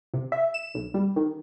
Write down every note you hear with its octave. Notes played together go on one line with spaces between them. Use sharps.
C3
E5
E7
B1
G3
D#3